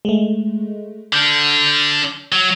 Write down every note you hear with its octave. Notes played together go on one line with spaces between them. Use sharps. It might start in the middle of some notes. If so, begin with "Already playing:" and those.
G#3 A3
D3 D4 F6 G6
F#3